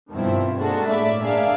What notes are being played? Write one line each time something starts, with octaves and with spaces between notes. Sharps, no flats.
G2 B2 D#3 F3 C4 E4
G#3 A#3 D4 F#4 A4
A2 A3 A#3 D5 E5 B5
A#3 D4 G#4 D5 E5 F5